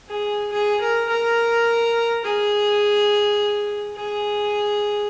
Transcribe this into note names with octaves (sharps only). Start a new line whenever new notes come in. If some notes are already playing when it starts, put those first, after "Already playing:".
G#4
G#4
A#4
A#4
G#4
G#4